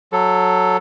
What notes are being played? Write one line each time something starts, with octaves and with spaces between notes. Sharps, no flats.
F#3 A4